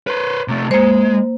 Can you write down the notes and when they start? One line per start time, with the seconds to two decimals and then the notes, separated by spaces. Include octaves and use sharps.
0.07 B4 C5
0.48 C3 A3
0.71 G#3 A#3 C5